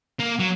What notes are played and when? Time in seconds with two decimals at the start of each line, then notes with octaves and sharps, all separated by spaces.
0.19 A#3
0.39 F#3